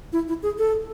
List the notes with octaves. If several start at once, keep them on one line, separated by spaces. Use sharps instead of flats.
E4
E4
G#4
A4